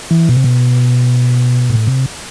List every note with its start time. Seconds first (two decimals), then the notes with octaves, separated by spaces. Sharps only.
0.11 E3
0.29 B2
0.37 C3
0.44 B2
1.70 A2
1.87 C3